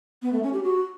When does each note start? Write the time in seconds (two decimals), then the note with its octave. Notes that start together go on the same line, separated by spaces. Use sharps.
0.22 B3
0.33 A3
0.43 C#4
0.53 G4
0.63 F#4